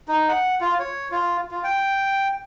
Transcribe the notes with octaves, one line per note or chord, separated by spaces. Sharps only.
D#4
F#5
F4
C#5
F4
F4
G5